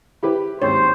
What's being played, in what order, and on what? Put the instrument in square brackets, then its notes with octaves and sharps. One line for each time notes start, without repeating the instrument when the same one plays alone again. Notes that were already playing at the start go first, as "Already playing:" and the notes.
[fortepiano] E4 G4 B4
[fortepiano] D#2 G#2 C4 [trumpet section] C5 [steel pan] C#5